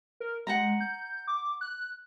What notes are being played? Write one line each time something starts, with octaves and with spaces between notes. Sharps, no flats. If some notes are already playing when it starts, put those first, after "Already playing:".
A#4
G#3 F#5 G5 A#5
G6
D6
F#6